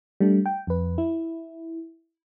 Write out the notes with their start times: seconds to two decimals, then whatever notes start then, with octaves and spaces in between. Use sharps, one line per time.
0.20 G3 A3 D4
0.46 G5
0.67 F2 B4
0.98 E4